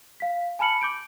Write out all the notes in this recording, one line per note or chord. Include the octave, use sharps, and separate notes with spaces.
F5 B6
G#5 A5 B5 F6 C#7 F#7
D6 G6 D7